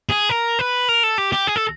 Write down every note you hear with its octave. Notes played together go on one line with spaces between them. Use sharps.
G#4
A#4
B4
A#4
A4
G4
G4
G#4
A4